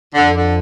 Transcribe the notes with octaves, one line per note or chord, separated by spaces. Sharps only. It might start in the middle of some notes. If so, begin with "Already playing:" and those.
F2 D3
D3